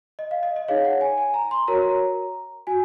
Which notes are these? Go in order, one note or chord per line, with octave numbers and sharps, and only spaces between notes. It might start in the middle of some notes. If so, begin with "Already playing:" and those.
D#5
F5
D#5
D#5
D#4 G#4 C#5 F5
F#5
G#5
G#5
A#5
C6
F#4 A#4 C#5 A#5
F#4 G#5